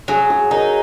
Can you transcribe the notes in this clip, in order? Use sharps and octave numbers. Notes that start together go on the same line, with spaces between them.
F#3 G#4
G#4
D#4 A#4